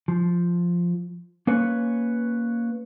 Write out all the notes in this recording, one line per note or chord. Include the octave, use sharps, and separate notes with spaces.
F3
A#3 C#4 B4 C#5